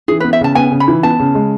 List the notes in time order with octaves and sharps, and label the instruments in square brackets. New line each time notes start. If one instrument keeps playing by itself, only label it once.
[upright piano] E3 [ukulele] G#4
[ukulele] B4
[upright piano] B3
[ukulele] E5
[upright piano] C#3 [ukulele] A5
[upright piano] B3 [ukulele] G#5
[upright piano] C#3
[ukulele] B5
[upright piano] E3
[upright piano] B3 [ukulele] A5
[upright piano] C#3
G#3